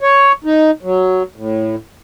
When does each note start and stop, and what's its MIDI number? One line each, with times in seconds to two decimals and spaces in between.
0.01 0.32 73
0.44 0.71 63
0.83 1.23 54
1.36 1.76 45